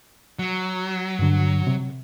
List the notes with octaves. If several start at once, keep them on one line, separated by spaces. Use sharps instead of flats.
F#3
G2 D3
C3